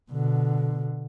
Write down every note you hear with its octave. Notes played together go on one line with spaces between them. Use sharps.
B2 D3